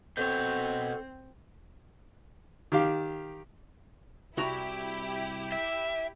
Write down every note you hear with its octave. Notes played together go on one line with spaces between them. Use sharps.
B2 C4 A4 C#5 G6
D#3 G4 F5
C2 E4 F#4 G4 A#5
E5